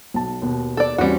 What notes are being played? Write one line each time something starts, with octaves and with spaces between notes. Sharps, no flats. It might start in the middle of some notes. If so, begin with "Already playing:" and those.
B1 A5
D#2 B2
A4 D5
E2 G3 C4 C#4 F#4